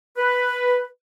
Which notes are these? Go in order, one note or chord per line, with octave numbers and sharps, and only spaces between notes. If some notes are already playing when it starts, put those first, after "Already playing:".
B4